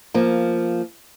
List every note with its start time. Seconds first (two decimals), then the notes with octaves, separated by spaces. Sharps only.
0.14 F3 A#3